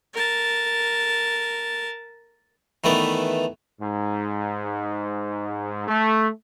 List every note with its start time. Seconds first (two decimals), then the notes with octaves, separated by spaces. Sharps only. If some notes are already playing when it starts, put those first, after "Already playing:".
0.14 A#4 A5
2.84 D#3 E3 A3 B3 D5
3.81 G#2
5.88 A3